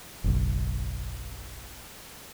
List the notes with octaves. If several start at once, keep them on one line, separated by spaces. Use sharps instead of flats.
F#1 B1